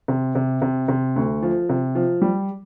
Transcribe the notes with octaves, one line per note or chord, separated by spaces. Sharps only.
C3
C3
C3
C3
D2
F3
C3
F3
G3